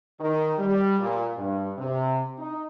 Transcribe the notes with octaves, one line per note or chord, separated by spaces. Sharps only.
D#3
G3
A#2
G2
C3
D#4